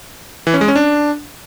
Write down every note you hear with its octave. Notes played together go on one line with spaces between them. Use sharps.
E3
C#4
G#3
C#4
D4